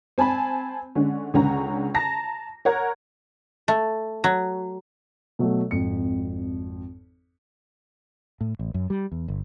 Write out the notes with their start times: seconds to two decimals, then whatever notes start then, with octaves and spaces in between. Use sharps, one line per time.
0.18 C4 G#5 A5 B5
0.95 D3 G#3 C#4
1.34 C#2 D3 C#4 F#5 A#5
1.94 A5 A#5 A#6
2.65 A#4 C#5 F#5 A#5 G#6
3.68 A3
4.24 F#3
5.39 B2 F#3 A3
5.71 G#1 F2 C#7
8.41 A2
8.59 A1
8.74 F#2
8.90 G3
9.12 E2
9.28 G1